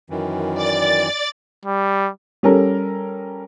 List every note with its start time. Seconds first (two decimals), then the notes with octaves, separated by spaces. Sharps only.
0.10 F#2 D#3 E3
0.55 D5 A6
1.65 G3
2.43 G3 C#4 A4 A#4